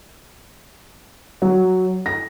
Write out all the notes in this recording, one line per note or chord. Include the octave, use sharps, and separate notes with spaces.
F#3
A#6